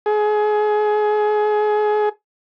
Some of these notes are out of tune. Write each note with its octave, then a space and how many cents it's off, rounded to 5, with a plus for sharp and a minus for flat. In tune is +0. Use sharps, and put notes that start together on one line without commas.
G#4 +25